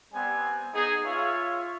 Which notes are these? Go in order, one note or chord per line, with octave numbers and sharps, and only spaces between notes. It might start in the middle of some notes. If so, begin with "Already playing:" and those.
G3 B3 C4 G#5
B3 D#4 G#4
F4 C#5 E5 F5